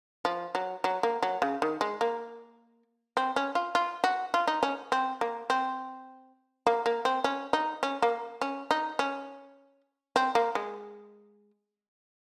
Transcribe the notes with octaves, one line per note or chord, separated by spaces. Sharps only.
F3
F#3
F#3
A#3
F#3
C#3
D#3
G#3
A#3
C4
C#4
F4
F4
F#4
F4
D#4
C#4
C4
A#3
C4
A#3
A#3
C4
C#4
D#4
C#4
A#3
C#4
D#4
C#4
C4
A#3
G#3